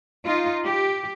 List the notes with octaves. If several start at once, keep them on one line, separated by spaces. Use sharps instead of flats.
D#4 F4
G4